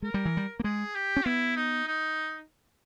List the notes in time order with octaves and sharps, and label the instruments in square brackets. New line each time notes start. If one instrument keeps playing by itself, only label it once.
[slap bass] G#3 [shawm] A#4
[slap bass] G3
E3
G3
A#3
[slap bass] G#3 [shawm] G#4
[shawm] G4
[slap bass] C#4
[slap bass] B3 [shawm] E4
[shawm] D#4
D#4